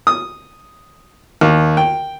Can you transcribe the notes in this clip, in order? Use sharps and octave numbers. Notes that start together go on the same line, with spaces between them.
D#6
D#2
G5